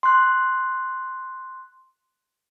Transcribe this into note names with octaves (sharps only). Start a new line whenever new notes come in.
C6 F#6